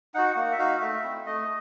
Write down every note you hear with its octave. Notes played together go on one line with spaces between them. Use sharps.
D#4 F#4 F#5
A#3 F#5
E5
D#4 F#4 F5
A3 E5
C4 E4
A3 D#5